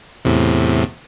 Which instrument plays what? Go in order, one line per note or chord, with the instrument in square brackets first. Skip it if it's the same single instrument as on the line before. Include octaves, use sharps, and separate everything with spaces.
[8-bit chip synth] E2 A2 C3